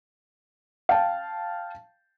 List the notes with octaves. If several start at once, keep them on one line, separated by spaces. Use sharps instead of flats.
F5 G5 A5